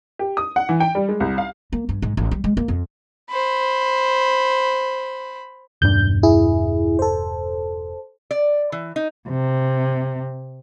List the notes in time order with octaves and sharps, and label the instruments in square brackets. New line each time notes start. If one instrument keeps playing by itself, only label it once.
[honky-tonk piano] G4
D#6
F#5
E3
G5
G3
G#3
C2
F5
[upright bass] A#3
G2
G#2
A1
G3
G#3
A#3
F2
[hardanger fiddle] C5 B5
[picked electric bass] E1 G2 D4 [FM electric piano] G6
[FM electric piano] E4 G#4
A4 C5
[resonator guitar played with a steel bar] D5
E3
D#4
[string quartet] C3